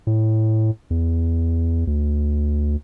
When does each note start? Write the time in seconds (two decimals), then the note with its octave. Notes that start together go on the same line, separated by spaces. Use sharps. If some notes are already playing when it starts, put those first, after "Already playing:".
0.07 A2
0.90 E2
1.87 D2